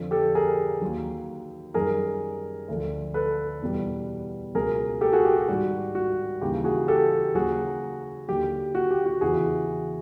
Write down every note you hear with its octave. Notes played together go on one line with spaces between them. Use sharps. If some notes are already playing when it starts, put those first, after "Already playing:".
Already playing: F2 D3 F3
G4 A4
G#4 A#4
D#2 D#3 F#3
F#2 D#3 G3 G#4 A#4
D2 D3 F3
A4 B4
E2 B2 G3
C#2 B2 F#3 G#4 A#4
G4 A4
F#4 G#4
G4
G4
G#2 D#3 G3 F#4
F#4
D#2 C#3 E3 G3 G4
F#4 G#4
G4 A4
D#2 C#3 F#3 F#4 G#4
D#2 D3 F#3 G4
F#4
G4
F#4
E2 C#3 E3 F#4 G#4